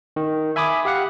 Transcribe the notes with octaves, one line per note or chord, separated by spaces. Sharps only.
D#3
E5 G#5 B5 D6 D#6
G4 F5 F#5